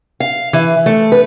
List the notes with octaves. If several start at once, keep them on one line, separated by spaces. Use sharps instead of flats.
F5
E3
A3
B4